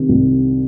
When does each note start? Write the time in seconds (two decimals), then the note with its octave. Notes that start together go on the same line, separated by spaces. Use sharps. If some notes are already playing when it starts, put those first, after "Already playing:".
Already playing: C3 D#3
0.09 C2